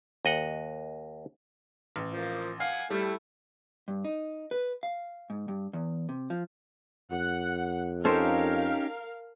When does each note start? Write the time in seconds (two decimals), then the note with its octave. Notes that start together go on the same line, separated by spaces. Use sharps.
0.25 D#2 D#5 F#5
1.96 A1
2.13 F3 A#3
2.60 F5 F#5 G#5
2.90 G3 A3 E4
3.88 G2
4.05 D#4
4.51 B4
4.83 F5
5.30 G#2
5.48 G2
5.73 E2
6.09 C3
6.30 F3
7.11 F2 F#5
8.05 C#4 D#4 G4 A4 A#4 C5 F5